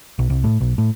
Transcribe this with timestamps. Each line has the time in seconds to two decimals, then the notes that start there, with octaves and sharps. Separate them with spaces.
0.19 B1
0.30 C2
0.44 A2
0.61 B1
0.78 A2